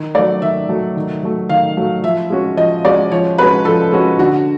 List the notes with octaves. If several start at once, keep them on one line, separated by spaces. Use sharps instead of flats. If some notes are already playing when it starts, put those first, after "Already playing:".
Already playing: D#3
F#3 A3 D5
D#3 E5
F#3 A3
D#3
F#3 A3
D#3 F5
F#3 A3
F3 E5
G#3 C#4 F#4
F3 D#5
G#3 C#4 F#4 D5
F3 C#5
G#3 C#4 F#4 B4
F3 A4
G#3 C#4 F#4
D3 F#4